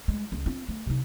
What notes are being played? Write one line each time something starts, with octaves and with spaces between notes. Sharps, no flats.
G3 G#3
C#2
C4 F4
A3
C3 D#4